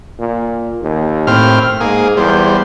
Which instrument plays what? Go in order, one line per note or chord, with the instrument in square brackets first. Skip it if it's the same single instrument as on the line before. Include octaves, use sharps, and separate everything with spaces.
[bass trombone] A#2
D#2
[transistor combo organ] A2 C4 F6
[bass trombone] G#2 [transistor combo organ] A#3 G#4
[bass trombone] E2 [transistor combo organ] G3 C5